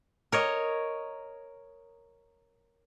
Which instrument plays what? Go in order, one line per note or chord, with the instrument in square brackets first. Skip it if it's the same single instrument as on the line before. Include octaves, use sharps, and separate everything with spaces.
[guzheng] A#4 C#5 D#5